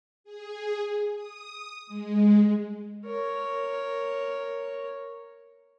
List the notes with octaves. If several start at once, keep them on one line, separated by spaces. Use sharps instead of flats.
G#4
D#6
G#3
A#4 C#5